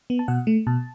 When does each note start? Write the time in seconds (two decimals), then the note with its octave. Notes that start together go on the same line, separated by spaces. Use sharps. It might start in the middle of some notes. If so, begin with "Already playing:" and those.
0.10 B3
0.19 A5
0.28 B2 F#5
0.47 A3
0.67 B2 A5